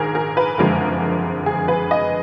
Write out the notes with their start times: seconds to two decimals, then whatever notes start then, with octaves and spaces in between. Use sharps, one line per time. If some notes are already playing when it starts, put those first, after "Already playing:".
Already playing: A#1 G#2 D#3 G#4 A#4
0.15 A#4
0.37 B4
0.58 F#1 F2 D3 G#3 A#4
1.46 G#4
1.68 B4
1.91 D#5